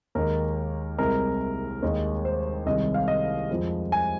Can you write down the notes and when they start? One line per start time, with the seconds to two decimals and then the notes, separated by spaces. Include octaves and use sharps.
0.15 D#2 D#3 G#3 A#4
0.98 C2 C3 G#3 A#4
1.82 D#2 D#3 G#3
2.25 C5
2.66 C2 C3 D#3 G#3 D#5
2.94 F5
3.08 D#5
3.50 F2 F3 G#3
3.92 G#5